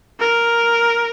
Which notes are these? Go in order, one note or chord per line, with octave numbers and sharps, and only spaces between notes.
A#4